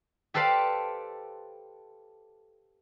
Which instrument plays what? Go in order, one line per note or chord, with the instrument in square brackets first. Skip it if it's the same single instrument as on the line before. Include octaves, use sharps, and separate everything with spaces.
[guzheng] G4 A4 B4 C5 D5 F5